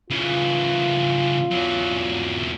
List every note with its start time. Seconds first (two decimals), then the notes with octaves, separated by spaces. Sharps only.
0.10 C#3 E3 F4
1.51 E2 F#3